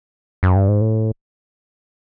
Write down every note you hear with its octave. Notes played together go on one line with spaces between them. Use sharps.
F#2
G2
G#2
A2